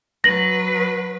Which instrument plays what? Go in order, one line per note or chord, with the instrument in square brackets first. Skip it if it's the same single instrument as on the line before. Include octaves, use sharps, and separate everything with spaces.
[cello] F#3 B4 [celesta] A#6 F#7